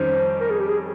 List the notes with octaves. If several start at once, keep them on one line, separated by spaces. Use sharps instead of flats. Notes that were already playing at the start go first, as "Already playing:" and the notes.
Already playing: F2 D#3 G3 C#4 C5
A#4
G#4
G4
G#4